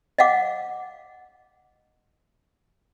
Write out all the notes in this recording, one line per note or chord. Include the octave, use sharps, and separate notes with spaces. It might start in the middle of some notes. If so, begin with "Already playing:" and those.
D#5 F5 F#5 D6